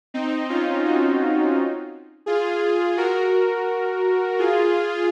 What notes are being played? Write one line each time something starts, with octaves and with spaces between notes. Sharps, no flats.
C4 D#4
C#4 F4
D#4 F#4
F4 G#4
F#4 A#4
F4 G#4